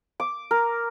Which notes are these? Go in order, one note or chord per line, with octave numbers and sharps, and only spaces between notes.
D6
A#4